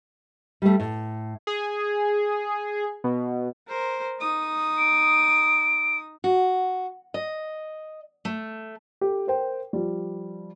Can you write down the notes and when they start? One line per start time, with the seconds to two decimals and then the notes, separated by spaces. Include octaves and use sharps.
0.62 G3 A3
0.80 A2
1.47 G#4
3.04 B2
3.68 A#4 C5
4.19 D#4 D#6
4.78 D7
6.24 F#4
7.14 D#5
8.25 A3
9.01 G4 A4
9.27 A#4 C5 G5
9.73 F3 G3